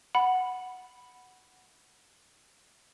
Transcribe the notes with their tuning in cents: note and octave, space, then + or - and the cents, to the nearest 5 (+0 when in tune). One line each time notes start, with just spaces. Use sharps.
F#5 +0 B5 +0